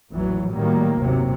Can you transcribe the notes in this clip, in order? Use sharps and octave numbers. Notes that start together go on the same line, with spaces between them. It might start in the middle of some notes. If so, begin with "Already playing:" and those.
A1 E2 A#2 E3 F#3
A2 D#3 F#3 G3 A#3
G1 D#2 C3 F#3